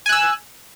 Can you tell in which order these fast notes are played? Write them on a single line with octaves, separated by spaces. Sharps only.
G#5 F#6 E6